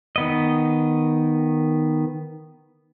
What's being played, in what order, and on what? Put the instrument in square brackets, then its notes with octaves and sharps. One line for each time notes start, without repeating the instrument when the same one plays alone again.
[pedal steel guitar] D#3 B3 D#5